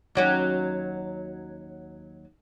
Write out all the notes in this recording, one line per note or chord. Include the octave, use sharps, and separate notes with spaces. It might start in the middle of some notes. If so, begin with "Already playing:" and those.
D#2 F#3 C#4